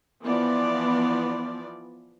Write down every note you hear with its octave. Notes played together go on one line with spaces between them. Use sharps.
E3 F3 B3 D5